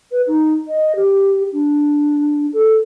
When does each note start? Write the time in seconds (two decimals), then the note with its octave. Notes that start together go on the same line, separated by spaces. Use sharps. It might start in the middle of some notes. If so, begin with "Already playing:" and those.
0.12 B4
0.27 D#4
0.68 D#5
0.96 G4
1.53 D4
2.53 A4